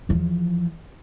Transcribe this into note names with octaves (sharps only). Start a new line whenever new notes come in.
E2 F3